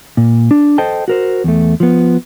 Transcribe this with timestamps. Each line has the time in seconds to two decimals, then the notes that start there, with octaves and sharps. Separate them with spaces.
0.17 A#2
0.51 D4
0.78 A4 C5 D#5 G5 A5
1.08 F#4 A#4 C5
1.44 E2 A3
1.80 F3 B3